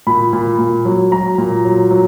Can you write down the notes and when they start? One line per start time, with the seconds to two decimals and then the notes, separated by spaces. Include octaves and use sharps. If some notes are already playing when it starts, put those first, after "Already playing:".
0.07 A#2 B5
0.33 A#2
0.58 A#2
0.85 F#3
1.12 F#3 A#5
1.38 A#2
1.65 F#3
1.91 F#3